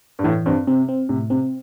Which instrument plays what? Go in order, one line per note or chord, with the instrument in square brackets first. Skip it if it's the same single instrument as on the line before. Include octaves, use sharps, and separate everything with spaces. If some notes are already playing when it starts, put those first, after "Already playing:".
[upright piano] G2
[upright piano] A2 [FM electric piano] E3
[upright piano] G2 [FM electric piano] C4
[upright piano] C3 [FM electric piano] C4
[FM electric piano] C4
[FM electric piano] A2 [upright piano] C3
[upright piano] C3 [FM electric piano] C4